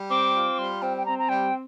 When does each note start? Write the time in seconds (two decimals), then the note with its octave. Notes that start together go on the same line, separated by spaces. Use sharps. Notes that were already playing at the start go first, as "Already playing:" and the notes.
Already playing: G3
0.10 C4 D6
0.35 F4
0.58 G3 C6
0.82 C4 G5
0.98 G5
1.06 C4 A#5
1.19 A#5
1.29 G3 G5